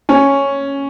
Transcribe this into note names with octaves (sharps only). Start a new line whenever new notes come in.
C#4